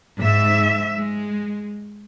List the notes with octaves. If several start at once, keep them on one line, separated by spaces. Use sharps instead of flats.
G#2 G#3 E5
G#3